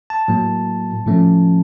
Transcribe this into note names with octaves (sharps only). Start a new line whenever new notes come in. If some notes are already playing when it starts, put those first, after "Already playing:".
A5
A2 F#3 A#3
A2 F3 A3 C#4